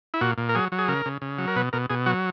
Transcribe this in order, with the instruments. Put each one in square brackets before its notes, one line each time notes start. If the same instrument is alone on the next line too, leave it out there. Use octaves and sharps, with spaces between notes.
[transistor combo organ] E4
A#2 F#4
A#2
A#4
F#3 G#4
F#3
G#4
C#3 A#4
C#3
C#3
F#3
A#4
B2 B4
B2 A#4
B2 G#4
F#3 F#4